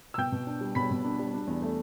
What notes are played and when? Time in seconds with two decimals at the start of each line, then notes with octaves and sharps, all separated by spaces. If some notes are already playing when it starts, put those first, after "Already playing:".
0.14 E6
0.18 B2 G5 G6
0.32 B2
0.47 D4
0.61 G3
0.75 B2 B5 B6
0.91 B2
1.04 D4
1.19 G3
1.34 D4
1.47 E2
1.62 A3